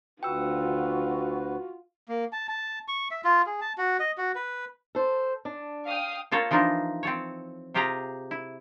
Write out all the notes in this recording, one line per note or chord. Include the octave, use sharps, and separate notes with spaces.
D2 D3 F4 F#4 B4 G5 E6
A#3
A5
A5
C#6
E5
F4
G#4
A5
F#4
D#5
F#4
B4
A4 C5
D4
F5 G5 D#6
A#3 F4 A4 C5 C#5
E3 F3 D4 D#4 F4
C4 A4 C#5
C3 F4 G4 G#4 F5 A#5
E4